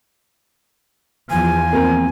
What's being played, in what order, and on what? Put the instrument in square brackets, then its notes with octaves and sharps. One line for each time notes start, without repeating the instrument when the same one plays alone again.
[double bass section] E2 F3 [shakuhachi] G#5
[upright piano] A#3 C4 A#4